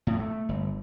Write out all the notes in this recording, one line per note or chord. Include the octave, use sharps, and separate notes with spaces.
A2
A3
G1